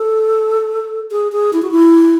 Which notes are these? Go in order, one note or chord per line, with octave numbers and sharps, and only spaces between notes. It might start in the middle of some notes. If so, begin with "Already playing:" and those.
Already playing: A4
G#4
G#4
E4
F#4
E4